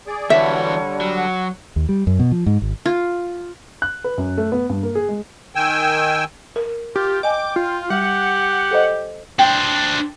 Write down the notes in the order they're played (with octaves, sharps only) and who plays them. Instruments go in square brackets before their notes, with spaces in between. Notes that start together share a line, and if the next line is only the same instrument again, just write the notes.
[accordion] G#4 D5
[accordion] D3 G3 [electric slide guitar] E3 F#4 B4 [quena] C#5 [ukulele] E5
[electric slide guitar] F#3
[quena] F#5
[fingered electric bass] D#2
G3
F#2
B2
F3
G#2
G#1
[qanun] F4
[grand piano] F#6
B4
F#2
A3
B3
G2
A#3
G#4
G#3
[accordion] D#3 G5 G#5 E6
[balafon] A#4
[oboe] F4 [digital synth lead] G4
[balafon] D#5 G#5 [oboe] G5 [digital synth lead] D6
[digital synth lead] F4
[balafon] G3 [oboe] G4 [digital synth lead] F#5
[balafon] A4 C5 D#5
[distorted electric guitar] D4 C5 [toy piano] G5